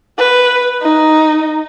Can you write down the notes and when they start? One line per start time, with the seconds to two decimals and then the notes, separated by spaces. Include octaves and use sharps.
0.18 B4
0.82 D#4